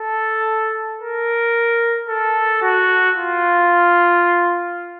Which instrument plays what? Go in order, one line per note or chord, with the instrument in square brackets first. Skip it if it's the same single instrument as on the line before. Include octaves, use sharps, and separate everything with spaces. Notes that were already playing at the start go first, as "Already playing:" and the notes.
Already playing: [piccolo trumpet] A4
A#4
A4
F#4
F4